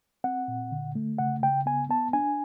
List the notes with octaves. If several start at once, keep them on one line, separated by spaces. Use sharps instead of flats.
C4 F#5
A#2
D3
A3
C#3 F#5
C#3 G5
B3 G#5
B3 A5
D4 G#5